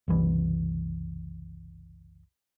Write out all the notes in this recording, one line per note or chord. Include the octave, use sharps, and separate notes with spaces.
F#1 C2 E3